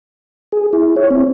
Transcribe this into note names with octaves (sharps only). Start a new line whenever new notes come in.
G#4
E4
C#5
C4